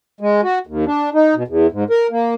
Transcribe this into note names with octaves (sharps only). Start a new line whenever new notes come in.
G#3
F#4
D#2
D4
D#4
B2
E2
G#2
A#4
A#3